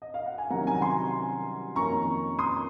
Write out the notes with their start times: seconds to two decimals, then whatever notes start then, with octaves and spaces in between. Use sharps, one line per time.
0.02 D#5
0.14 F5
0.26 F#5
0.38 G#5
0.50 C2 C3 D#3 F#3 C#4 F#5 A#5
0.67 G#5
0.75 A#5
0.81 G#5 C6
1.76 F2 D#3 A#3 C#4 A#5 C#6
2.39 C6 D#6